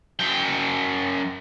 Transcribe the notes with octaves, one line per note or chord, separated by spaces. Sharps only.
F#2 G5